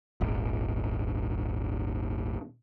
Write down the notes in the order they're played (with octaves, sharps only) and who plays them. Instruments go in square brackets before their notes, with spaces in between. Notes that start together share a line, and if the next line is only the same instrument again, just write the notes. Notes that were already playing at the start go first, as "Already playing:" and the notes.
[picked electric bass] D#1 G#1